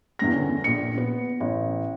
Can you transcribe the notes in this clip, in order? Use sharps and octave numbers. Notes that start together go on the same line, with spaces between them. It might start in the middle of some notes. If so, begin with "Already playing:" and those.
E2 G2 A#6
D3 C#4
A#1 A#2 C#7
B3
A1